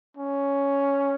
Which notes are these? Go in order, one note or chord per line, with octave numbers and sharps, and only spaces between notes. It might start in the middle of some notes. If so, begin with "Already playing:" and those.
C#4